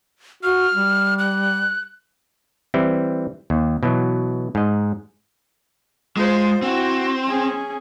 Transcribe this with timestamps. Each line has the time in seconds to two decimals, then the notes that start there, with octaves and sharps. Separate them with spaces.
0.43 F#4 F6
0.75 G3
1.19 F#6
2.74 E3 G3 C4 E4
3.50 D#2
3.83 B2 E3 F#3
4.55 G#2 D#5
6.17 G#3 F4 C5
6.62 C4 E4 F#4
7.27 C#4 G#4